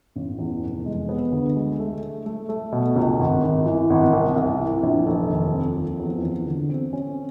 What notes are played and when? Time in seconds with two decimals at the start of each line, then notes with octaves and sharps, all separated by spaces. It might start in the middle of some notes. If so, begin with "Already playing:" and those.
0.16 A1
0.39 E2
0.62 F1
0.86 G#3
1.09 B3
1.32 D2
1.56 G#3
1.79 A3
2.03 A3
2.26 A3
2.49 A3
2.72 B2
2.96 C#2
3.19 G#1
3.43 G#1
3.66 E3
3.90 G#1
4.13 C2
4.36 C2
4.59 E3
4.83 A#1
5.06 F1
5.30 D#2
5.53 F2
5.77 F3
6.00 E2
6.23 E2
6.46 D3
6.69 C4
6.93 C#4